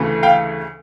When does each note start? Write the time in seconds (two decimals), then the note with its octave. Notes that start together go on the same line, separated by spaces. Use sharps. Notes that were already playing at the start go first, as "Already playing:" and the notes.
Already playing: D2 C#3 E3 A3
0.23 F5 G5